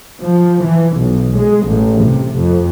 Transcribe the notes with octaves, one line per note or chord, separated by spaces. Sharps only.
F3
E3
B1
G#3
A1
C3
F2